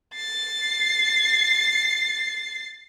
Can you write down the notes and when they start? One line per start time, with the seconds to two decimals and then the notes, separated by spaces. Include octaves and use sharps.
0.15 A6 C7